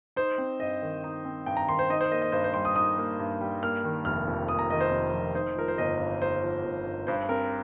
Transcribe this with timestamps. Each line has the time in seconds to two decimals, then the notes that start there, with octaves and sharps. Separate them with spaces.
0.16 D#4 C5
0.38 C4
0.60 G2 D#5
0.82 D#3
1.04 D#4
1.25 C4
1.46 G2 G5
1.57 A#5
1.68 D#3 C6
1.79 C5
1.90 D#4 D#5
2.01 C5
2.12 A#3 D#5
2.22 D#5
2.32 G2 C5
2.44 C5
2.54 G3 C6
2.65 D#6
2.76 D#4 D#6
2.98 A#3
3.19 G2
3.41 G3
3.62 A#3 F6
3.84 D#3
4.05 F1 F6
4.28 F2
4.48 A#3 D#6
4.59 A#5
4.70 D#3 D#5
4.81 C5
4.91 F1
5.14 F2
5.35 D#4 C5
5.56 F3 A#4
5.68 C5
5.78 G1 D#5
5.99 G2
6.21 D#4 C5
6.43 F3
6.64 G1
6.86 G2
7.07 G2 C5
7.29 C4 A#4